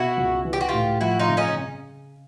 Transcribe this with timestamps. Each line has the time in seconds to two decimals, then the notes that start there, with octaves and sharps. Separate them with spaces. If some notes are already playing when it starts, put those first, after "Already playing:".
Already playing: B2 E4 F#4
0.17 C#2
0.45 E3
0.53 G4
0.61 F#4
0.69 A2 F4 G4
1.01 F3 E4 F#4
1.19 D#4 F4
1.29 C#3
1.37 C#4 D#4
1.57 C#3